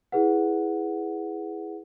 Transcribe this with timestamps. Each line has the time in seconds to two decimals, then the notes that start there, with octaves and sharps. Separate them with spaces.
0.12 E4 G#4 B4 F#5